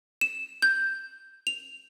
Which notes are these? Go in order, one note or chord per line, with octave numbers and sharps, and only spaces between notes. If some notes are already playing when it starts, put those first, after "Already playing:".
E7
G6
F7